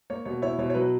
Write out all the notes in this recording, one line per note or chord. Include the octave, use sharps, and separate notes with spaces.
A#3 C#5
B2 C#5
E4 C#5
B2 C#5
C#5
F#3 B4